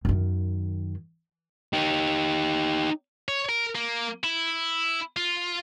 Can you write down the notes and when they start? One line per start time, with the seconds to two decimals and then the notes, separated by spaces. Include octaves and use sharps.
0.05 F#2 D#3
1.73 D#4 G4
3.28 C#5
3.49 A#4
3.75 A#3
4.24 E4
5.16 F4